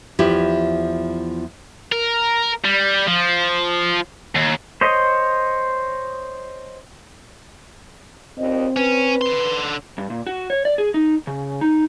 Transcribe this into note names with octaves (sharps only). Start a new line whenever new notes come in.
E2 F3 E4 G4
A#4
G3
F3
D#2
C5 C#5 D#5
D#2 A#2 C4 D#5
C#4 B4
D3 C6
G2
A#2
F#4
C#5
D5
G#4
D#4
C#3
D#4